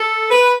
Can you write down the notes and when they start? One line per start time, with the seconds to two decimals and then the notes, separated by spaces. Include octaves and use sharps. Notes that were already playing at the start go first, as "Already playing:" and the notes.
Already playing: A4
0.31 B4